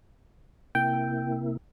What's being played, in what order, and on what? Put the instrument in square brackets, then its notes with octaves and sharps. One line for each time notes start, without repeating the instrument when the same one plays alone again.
[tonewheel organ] C3 A#3 E4 [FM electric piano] G5